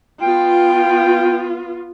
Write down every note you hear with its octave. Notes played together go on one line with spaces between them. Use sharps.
B3 F4 G5